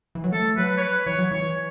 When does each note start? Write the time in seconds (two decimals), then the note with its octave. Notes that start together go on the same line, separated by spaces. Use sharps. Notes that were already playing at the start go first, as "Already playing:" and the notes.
0.15 E3
0.24 F#3
0.32 A3 A4
0.57 F#3 B4
0.78 C#5
0.82 B4
1.06 E3 C#5
1.19 F#3
1.31 E3 C#5